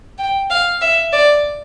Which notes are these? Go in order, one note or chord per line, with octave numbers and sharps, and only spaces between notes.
G5
F5
E5
D5